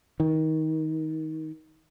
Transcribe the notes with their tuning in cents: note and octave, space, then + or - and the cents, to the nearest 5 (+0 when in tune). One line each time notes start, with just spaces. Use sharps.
D#3 +20